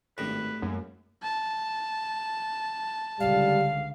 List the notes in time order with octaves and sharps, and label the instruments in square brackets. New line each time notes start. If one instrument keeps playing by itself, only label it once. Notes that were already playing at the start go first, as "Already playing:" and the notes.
[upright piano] G#1 A#6 [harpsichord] E2 A2 G3 [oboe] B4
[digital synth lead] F#2 [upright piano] G#3 A#3
[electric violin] A5
[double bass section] C#2 D3 [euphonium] G3 [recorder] F5